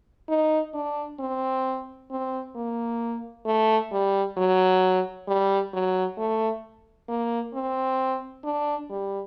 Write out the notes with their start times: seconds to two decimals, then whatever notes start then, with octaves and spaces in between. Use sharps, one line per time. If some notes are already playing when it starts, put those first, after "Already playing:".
0.29 D#4
0.74 D4
1.20 C4
2.11 C4
2.56 A#3
3.46 A3
3.92 G3
4.37 F#3
5.28 G3
5.73 F#3
6.18 A3
7.09 A#3
7.54 C4
8.44 D4
8.90 G3